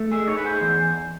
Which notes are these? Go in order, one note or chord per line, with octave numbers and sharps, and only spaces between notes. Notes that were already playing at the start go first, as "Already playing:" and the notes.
Already playing: A3
G#4 E5
D#4 C#5
B4
G#4 C5
E2 C5